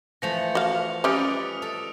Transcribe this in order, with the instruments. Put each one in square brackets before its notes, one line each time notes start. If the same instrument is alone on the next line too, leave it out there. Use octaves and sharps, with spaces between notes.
[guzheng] E3 F3 A3 [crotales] A#6 C#7 F7
[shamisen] F#4 F5
[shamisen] G3 C#4 [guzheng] B4 D5 D#5 [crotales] D#6 F6 D7
[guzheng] A4